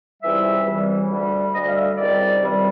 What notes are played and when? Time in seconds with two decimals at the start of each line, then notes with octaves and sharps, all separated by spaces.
0.22 C#2 C3 E3 G3 E5
0.66 C#2 C3 E3 G3
1.10 D2 D3 G3
1.53 D2 D3 G3 D#5
1.67 F5
1.75 E5
1.97 C#2 C3 D#3 G3 D5
2.42 C#2 C3 D#3 G3